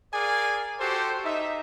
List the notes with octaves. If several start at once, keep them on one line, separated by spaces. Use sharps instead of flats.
G#4 A#4 D5 F5 G#5
F#4 G4 A4 C5
D#4 E5